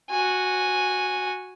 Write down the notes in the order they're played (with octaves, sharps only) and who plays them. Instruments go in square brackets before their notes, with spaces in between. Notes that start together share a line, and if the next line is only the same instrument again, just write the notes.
[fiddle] F#4 G#5